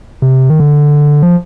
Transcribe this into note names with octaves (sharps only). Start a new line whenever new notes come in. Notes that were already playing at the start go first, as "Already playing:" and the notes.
C3
D#3
D3
F3